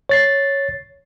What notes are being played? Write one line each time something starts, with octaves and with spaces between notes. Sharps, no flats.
C#5 A6 C7